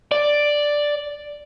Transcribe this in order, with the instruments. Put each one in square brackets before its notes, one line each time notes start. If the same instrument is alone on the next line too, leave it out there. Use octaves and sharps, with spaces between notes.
[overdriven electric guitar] D5